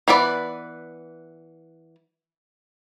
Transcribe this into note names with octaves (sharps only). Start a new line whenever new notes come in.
E3 B3 B4 D5